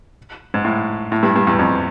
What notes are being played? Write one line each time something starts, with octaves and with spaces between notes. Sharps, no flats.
G#2
A2
A2
G2
G2
E2
F2